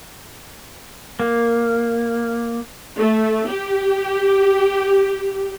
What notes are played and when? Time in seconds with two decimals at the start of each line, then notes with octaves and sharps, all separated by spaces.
1.20 A#3
2.97 A3
3.48 G4